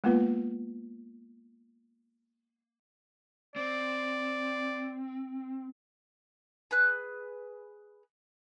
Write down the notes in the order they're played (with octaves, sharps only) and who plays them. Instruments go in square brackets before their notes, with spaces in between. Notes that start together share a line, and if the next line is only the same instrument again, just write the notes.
[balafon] G#3 A#3 B3 F4 B4
[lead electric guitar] C4 [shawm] D5
[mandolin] G#4 B4 F#6